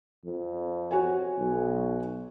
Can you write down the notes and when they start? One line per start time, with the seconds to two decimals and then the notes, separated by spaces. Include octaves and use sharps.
0.25 F2
0.91 F#4 C#5 G#5
1.38 B1